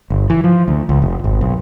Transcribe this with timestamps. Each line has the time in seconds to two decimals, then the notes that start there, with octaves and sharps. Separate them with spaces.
0.10 G1
0.30 E3
0.44 F3
0.68 D2
0.89 C#2
1.02 F1
1.24 G#1
1.41 B1